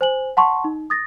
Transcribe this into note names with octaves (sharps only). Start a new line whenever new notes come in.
C5 G#5 F#7
F#5 A5 C6 C#6
D#4
D#6 A6 A#6